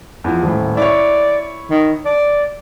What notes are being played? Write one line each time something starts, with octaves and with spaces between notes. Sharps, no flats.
E2 F3
D#1 A2
E4 C#5 D5
D#3
D5